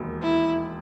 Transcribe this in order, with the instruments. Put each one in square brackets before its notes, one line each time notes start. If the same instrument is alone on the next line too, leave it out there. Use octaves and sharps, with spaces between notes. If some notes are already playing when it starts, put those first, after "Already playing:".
Already playing: [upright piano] E1 D#2 D#3 F#3
[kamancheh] E4